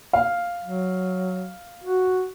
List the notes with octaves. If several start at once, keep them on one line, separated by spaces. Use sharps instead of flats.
F5
F#3
F#4